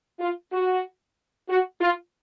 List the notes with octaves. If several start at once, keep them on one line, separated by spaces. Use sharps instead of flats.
F4
F#4
F#4
F4